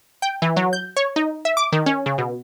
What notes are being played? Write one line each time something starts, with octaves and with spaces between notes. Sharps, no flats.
G5
E3
F#3
G6
C#5
D#4
E5
D6
D#3
C#4
C#3
B2